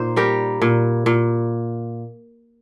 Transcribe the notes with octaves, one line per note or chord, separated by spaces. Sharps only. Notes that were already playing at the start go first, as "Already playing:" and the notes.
Already playing: A#2 D#4 C5
G3 G4 A#4
A#2
A#2